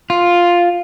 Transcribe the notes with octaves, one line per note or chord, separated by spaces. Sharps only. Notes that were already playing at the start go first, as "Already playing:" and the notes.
F4